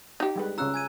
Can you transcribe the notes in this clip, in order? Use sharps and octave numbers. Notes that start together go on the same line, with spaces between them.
D#4 G4
G3 G#3 B4
C#3 C#4 F4 A#5 E6 F#6
G#5 G#6 D#7